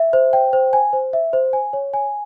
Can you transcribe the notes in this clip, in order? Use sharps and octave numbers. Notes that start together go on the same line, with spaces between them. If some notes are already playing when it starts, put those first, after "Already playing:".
Already playing: E5
C5
G5
C5
G#5
C5
E5
C5
G#5
C#5
G#5